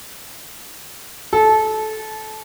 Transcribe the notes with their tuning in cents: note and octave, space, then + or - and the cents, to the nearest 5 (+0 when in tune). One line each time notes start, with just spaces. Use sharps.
A4 -20